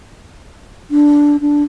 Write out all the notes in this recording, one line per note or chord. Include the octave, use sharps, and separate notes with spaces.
D4
D4